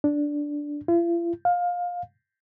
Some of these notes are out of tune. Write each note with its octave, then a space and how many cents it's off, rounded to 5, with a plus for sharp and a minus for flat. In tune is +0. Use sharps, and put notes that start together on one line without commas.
D4 -5
F4 -45
F5 +20